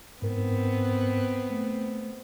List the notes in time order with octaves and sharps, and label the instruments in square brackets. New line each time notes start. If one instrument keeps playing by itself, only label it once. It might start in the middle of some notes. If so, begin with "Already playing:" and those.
[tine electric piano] G#2 A#4 [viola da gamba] B3 C4
[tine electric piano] A3